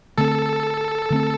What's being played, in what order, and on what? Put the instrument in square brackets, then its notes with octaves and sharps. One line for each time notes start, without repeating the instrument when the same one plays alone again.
[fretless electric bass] D3 A3 C4 [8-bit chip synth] A4
[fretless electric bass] D3 A3 C4